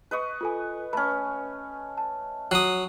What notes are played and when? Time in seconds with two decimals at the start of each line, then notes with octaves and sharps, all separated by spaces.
0.11 B4 D#5 C#6
0.41 F4 A4 G#5
0.93 A3 C#4 B4 B5
1.98 A5
2.51 F#3 D#6 F#6 C7 D#7